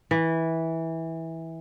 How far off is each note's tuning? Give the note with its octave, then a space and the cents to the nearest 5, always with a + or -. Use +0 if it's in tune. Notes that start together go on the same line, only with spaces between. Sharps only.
E3 -15